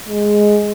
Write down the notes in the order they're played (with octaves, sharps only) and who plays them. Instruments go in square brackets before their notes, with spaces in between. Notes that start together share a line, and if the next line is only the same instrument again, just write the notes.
[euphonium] G#3